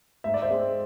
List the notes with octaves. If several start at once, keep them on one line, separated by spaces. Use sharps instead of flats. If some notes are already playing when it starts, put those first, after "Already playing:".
G#2 E5
D5
C5 E5
G#3 C4